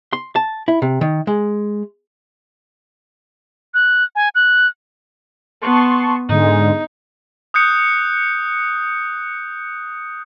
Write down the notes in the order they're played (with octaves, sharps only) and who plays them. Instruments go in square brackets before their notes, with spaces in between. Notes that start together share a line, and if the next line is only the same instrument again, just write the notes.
[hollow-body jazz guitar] C6
A5
E4
C3
D#3
G#3
[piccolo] F#6
G#5
F#6
[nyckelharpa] B3 [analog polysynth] A5 C6 C#6
[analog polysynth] G#2 D3 G#3 [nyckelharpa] D#4
[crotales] D#6 F#6 G6 C#7